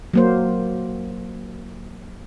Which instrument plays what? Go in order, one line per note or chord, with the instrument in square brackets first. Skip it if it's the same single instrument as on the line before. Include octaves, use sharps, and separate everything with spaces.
[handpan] F#3 A#3 C5